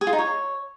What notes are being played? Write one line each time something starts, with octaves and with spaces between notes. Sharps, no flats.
G#4
F4
D#4
C#5